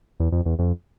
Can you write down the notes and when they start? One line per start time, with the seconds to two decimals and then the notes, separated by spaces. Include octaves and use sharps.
0.20 E2
0.32 F2
0.46 E2
0.59 F2